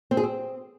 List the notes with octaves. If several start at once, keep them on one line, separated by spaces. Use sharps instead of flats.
C4
G#4
C4